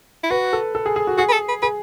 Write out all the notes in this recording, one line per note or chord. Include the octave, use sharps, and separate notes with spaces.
E4
F#4 B4
A4
A4
G#4
G#4
F#4
F#4 G#4
B4
A4
B4
G#4 B4